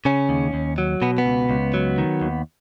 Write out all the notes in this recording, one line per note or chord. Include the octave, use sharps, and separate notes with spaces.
C#3 C#4
D#2
D#2
F#3
B2 B3
B3
C#2
C#2
F#3
D#3
D#2